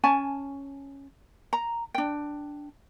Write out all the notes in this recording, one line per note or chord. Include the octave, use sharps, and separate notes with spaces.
C#4 C#5 G#5 A5
A#5
D4 G5